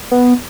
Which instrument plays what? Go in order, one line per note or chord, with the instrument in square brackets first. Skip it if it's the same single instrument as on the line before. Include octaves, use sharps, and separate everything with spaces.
[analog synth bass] B3